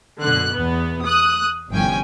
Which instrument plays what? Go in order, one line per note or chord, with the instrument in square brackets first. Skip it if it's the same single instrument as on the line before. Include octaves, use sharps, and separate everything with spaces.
[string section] F#2 B2 D3 F#6
E2 B3
D#6 F#6
G1 C2 F3 C#4 G5 G#5